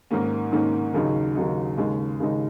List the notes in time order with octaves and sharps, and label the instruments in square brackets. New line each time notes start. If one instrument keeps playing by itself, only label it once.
[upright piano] G#2 D#3 A#3 C#4
G#2 D#3 A#3 C#4
D#2 C#3 F#3 D#4
D#2 C#3 F#3 D#4
D#2 C#3 G#3 D#4
D#2 C#3 G#3 D#4